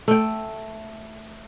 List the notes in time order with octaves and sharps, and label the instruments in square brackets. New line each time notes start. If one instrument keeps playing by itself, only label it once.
[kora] A3 G5